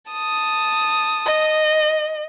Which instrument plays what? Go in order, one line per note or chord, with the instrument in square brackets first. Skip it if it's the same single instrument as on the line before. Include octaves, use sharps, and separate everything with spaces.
[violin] A5 D#6
[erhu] D#5